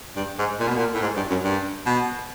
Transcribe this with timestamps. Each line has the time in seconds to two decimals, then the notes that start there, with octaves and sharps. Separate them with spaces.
0.16 G2
0.38 G#2
0.59 A#2
0.67 B2
0.76 A#2
0.94 A2
1.02 G#2
1.16 G2
1.30 F#2
1.44 G2
1.86 B2